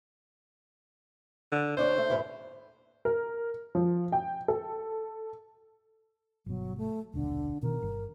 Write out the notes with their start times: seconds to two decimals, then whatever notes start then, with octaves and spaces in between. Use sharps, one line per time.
1.52 D3
1.77 D2 D4 C5 C#5
1.98 A3
2.10 E2 G#2 E3
3.05 A#4
3.75 F3
4.12 G5
4.48 A4
6.46 G1 B2 F#3
6.78 A3
7.14 D#1 B1 D3
7.63 B2 D#3 A#4
7.82 G1